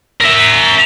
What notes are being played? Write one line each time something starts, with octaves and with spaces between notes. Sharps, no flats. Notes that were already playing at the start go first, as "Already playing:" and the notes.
A#4 E5